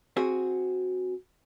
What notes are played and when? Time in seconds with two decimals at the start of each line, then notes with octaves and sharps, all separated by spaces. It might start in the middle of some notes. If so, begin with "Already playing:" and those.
0.17 C4 F#4 G#4